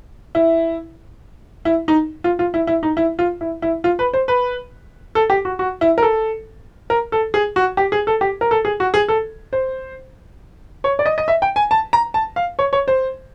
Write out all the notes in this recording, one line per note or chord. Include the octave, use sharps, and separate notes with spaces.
E4
E4
D#4
F4
F4
E4
E4
D#4
E4
F4
E4
E4
F4
B4
C5
B4
A4
G4
F#4
F#4
E4
A#4
A4
A#4
A4
G#4
F#4
G4
G#4
A4
G4
A#4
A4
G#4
F#4
G#4
A4
C5
C#5
D5
D#5
D#5
E5
G5
G#5
A5
A#5
A5
F5
C#5
C#5
C5